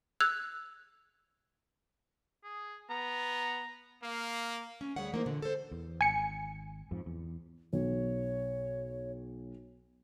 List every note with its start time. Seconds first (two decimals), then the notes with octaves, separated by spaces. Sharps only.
0.20 E6 F#6 G#6 F7
2.44 G#4
2.90 B3 A#5
4.03 A#3 F5
4.81 C#4
4.96 D2 G3 G#4 C#5 F#5
5.12 E3 A#3 D#4 C5
5.26 A#2 D3
5.42 A4 C5
5.72 E2
6.01 G#1 G#5 C#7
6.91 F2 G#2 F3
7.06 E2
7.73 B1 C#5